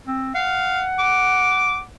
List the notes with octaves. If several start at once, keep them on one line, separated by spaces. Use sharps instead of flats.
C4
F5 F#5
D6